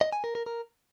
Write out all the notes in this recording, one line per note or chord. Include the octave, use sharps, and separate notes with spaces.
D#5
G#5
A#4
A#4
A#4